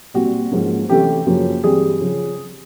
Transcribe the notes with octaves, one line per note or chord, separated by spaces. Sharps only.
A#2 G3 C4 F#4
G#2 F3 A#3 C#4
C3 E3 A3 C#4 G4
F#2 C#3 F3 A#3 C#4
G2 E3 G3 C4 G#4
C#3 F3